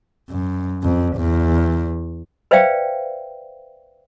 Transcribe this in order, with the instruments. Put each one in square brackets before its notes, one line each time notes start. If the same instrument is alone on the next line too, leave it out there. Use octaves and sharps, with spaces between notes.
[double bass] F#2
F2
E2
[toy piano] B4 C5 D5 E5 F5 G5